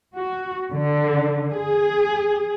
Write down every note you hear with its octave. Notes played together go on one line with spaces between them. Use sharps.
F#4
D3
G#4